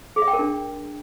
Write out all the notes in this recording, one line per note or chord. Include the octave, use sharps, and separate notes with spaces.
G#4
E5
G5
A#4
D4